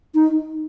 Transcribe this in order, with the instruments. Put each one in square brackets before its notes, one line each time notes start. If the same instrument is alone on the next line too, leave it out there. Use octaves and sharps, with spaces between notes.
[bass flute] D#4